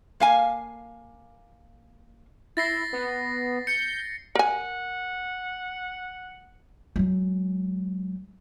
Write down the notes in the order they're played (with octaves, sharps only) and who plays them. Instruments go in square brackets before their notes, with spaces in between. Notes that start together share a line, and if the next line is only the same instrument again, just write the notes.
[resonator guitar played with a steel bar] A#3 F5 G#5
[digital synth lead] E4 [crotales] A6 A#6 C7
[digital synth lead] B3
[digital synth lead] G6 [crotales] C#7
[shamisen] A#4 G#5 [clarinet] F#5
[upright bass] F#3 G#3